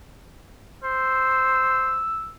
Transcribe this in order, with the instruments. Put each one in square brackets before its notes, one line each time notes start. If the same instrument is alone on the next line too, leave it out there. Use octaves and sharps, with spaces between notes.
[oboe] C5 [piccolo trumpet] E6